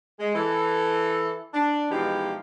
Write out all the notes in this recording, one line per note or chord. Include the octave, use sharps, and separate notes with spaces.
G#3
E3 A4
D4
B2 E3 F3 G#3 D#4 G4